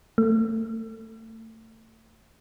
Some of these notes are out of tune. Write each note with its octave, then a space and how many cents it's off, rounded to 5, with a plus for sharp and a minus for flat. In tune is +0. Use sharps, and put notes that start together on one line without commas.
A3 +25